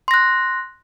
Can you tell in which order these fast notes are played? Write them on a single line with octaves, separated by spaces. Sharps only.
C6 A#6 F#6